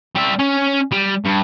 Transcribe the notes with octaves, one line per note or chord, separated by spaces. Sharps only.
G3 E5
C#4
G3
G2